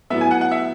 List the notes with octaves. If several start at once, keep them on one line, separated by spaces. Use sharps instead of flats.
A2 F#3 B3 E5
G#5
F#5
F#5
E5